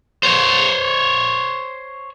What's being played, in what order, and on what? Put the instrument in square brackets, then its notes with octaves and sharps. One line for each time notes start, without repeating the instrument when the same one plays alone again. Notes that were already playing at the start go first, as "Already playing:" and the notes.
[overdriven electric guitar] C5 C#5